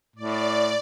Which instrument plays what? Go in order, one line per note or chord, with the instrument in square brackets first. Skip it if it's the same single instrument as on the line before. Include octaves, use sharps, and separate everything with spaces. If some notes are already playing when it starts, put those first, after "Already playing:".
[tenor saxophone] A2 [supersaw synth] D5